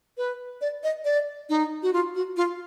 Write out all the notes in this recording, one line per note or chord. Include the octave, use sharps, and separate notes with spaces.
B4
D5
D#5
D5
D#4
F#4
F4
F#4
F4